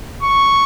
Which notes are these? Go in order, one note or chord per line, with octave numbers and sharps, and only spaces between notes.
C#6